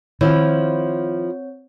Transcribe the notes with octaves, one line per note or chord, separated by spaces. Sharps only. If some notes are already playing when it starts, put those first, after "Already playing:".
D#3 F3 C4 E4 C#5